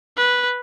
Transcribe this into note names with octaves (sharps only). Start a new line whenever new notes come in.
B4